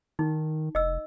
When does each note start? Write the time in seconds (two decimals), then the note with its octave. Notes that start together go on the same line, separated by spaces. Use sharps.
0.19 D#3 D#4
0.75 F1 D#5 E6